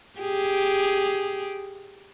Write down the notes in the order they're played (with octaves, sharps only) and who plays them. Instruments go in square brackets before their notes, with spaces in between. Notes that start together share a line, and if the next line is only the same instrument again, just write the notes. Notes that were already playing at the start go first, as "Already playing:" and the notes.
[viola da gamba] G4 G#4